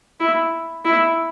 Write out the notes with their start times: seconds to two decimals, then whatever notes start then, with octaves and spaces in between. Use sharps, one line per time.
0.20 E4
0.85 E4